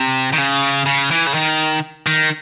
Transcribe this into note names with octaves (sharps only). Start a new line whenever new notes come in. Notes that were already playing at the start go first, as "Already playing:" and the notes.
Already playing: C3
D#3
C#3
C#3
E3
C#3
D#3
D#3